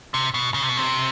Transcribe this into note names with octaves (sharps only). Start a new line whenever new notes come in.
C3
B2
C#3
C3
B2
C3